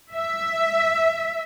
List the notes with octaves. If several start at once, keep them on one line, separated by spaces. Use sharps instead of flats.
E5